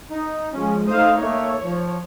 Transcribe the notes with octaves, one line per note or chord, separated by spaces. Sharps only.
D#4
F3 G#3 C#4
A3 D#4 C5 F5 D#6
A3 A#3 C#5
F3